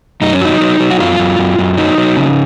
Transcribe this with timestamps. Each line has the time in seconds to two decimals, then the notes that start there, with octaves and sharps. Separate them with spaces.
0.22 F#2 D#4
0.33 C#4
0.41 F#3 D#4
0.60 F#3
0.80 F#3
0.90 F#4
1.00 F#2 F4
1.19 F#2
1.39 F#2
1.59 F#2
1.77 F#3 D#4
1.98 F#3
2.17 C#3